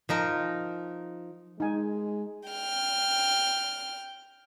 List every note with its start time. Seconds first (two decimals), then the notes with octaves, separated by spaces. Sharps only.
0.09 F3 D#4 A#4
1.60 G#3 D#4 G#5
2.49 G5 F6